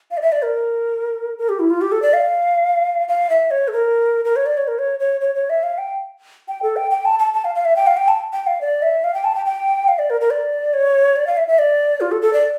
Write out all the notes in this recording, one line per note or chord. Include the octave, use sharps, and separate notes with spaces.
F5
D5
E5
D5
A#4
A#4
G4
E4
F4
G4
A4
D5
F5
F5
E5
C#5
A4
A#4
A#4
C#5
D5
C#5
A#4
C#5
C#5
C#5
C#5
E5
F5
G5
G5
A4
G5
G5
A5
A5
A5
F5
F5
E5
G5
F5
G5
A5
G5
F5
D5
E5
F5
G5
A5
G5
G5
F5
D5
A#4
A#4
D5
C#5
D5
F5
E5
E5
D5
F4
A4
A4
D5